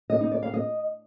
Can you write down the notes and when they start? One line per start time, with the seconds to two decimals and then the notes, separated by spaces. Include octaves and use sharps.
0.10 D#5
0.21 D#4
0.32 D5
0.43 F5
0.54 D#5